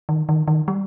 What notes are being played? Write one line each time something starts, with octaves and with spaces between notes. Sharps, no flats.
D#3
D#3
D#3
G3